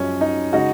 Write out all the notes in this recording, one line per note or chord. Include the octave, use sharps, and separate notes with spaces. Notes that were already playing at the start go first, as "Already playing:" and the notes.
Already playing: F#2 F3 G#3 C#4
D#4
C#3 G#3 D#4 F#4